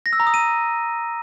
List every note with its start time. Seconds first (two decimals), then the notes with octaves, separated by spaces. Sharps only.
0.06 A#6
0.13 E6
0.20 A#5
0.27 D#6
0.34 D#7